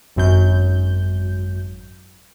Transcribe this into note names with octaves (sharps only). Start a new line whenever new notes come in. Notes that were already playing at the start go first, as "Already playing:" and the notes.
G#1 F#2 G6